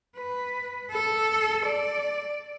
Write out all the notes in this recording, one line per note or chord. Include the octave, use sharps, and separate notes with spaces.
B4
A4
D5